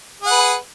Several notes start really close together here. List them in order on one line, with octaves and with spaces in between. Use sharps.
G#4 F#5 B4